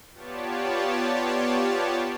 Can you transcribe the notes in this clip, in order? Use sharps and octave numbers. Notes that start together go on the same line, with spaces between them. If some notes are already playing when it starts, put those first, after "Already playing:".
B3 F4 G4 C#5 D5 A5